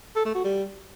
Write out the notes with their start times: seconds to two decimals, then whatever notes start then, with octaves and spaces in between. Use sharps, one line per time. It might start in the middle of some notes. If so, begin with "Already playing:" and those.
0.16 A4
0.25 A3
0.35 F#4
0.44 G3